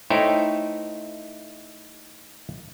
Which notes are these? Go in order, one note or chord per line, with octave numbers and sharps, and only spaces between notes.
A3 D#4 E4 C5 C#5 G5